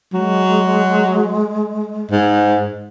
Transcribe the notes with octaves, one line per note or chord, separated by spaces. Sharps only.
F#3 G#3
G#2